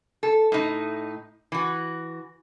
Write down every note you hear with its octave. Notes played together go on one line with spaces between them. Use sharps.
A4
A2 D#4
E3 F#4